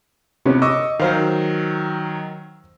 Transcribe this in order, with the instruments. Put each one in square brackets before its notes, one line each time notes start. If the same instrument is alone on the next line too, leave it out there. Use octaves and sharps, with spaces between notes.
[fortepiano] C3 B3 C#4
[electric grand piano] D#5 C#6 E6 [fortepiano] D6
[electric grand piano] D#3 F#3 [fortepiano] C5 F5